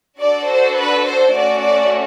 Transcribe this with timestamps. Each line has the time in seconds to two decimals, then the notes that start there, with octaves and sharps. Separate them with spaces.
0.21 D4 F#4 A4 D5
0.50 C5
0.77 B4
1.06 C5
1.34 A3 C#4 F#4 D5
1.62 D5